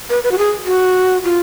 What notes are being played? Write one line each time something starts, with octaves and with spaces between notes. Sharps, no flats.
B4
B4
F#4
G#4
F#4
F4